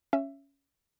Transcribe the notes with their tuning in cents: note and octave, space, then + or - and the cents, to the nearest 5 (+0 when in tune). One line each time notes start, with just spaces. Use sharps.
C#4 +0 E5 +20